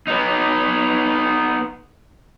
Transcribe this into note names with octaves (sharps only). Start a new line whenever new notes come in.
B3 D#4